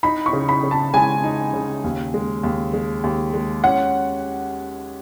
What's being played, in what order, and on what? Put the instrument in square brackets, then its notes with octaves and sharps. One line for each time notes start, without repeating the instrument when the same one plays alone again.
[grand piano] D#4 [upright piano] B5
[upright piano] C#6
[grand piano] C#3
[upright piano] B5
[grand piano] C#3
[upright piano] A5
[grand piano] G#3 [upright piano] G#5
[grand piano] D#4
C#3
D#2
G#3
D#2
G#3
D#2
G#3
[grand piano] C#4 [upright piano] F#5